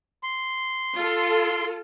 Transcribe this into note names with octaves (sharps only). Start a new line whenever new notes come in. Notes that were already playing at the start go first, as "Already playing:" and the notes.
C6
F4 A4